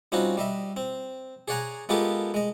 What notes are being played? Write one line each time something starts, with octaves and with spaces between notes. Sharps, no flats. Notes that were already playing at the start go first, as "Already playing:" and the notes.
G3 C4 C#4 D#4 F4 F#4
G3 D#5 E5
C4
G#4 C#5 D5 F#5 G#5 A#5
G#3 B3 F4 G4 A4 A#4
G#3 D#5